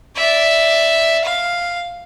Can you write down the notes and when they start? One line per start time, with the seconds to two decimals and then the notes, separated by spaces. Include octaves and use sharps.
0.17 D5 E5
1.25 F5